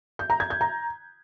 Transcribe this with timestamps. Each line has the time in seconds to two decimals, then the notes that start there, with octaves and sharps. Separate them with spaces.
0.19 G6
0.30 A#5
0.40 G#6
0.50 G6
0.61 A#5